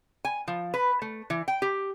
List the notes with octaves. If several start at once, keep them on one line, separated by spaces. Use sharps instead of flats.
G#5
F3
B4
A3
E3
G5
G4